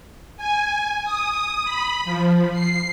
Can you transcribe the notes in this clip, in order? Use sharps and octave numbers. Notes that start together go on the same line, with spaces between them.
G#5
D#6
B5
F3
C7